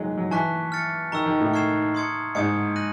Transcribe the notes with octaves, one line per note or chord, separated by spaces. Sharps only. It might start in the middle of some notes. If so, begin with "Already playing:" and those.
Already playing: D#3 F3 F#3 G#3
F#3
E3 A5 C#6 F#6 B6
F6 A6 C#7
D#3 A#5 C#6 E6
D#3
A2
C#6 F6 G#6 C7 E7
C6 D#6 G#6 C#7
G#2 D#6 G#6 C#7
F#6 A#6 D#7 F#7